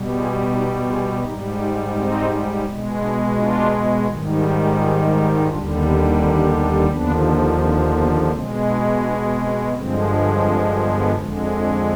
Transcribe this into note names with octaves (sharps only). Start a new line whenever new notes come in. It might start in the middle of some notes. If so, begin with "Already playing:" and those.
Already playing: B2 G3
F4 G#4
D#4 G4
F4 G#4
G#2 G3 D#4 G4
D#4 G4
C4 D#4
B2 G#3
B3 D4
D4 F4
G#2 D#3 G3
D#4 G4
F4 G#4
D#4 G4
D#2 D3 G3 D4 F4
B3
C4 D#4
B3 D4
D#2 D3 F3 B3 D4
C4
B3
B2 G#3 C4
B3 D4
B3 D4
C4
G2 D3 F3 G#3 C4
C4
B3
F2 D3 G#3